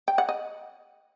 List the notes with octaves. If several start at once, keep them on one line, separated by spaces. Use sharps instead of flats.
G5
F#5
D#5